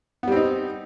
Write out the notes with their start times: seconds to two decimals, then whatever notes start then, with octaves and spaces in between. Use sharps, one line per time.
0.23 B3
0.27 G3
0.32 C4
0.36 D#4